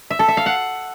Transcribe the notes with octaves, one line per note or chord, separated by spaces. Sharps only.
E5
A4
E5
F5
F#5